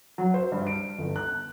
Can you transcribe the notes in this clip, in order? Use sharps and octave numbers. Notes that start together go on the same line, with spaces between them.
F#3
C5
G2
D7
G1
F#6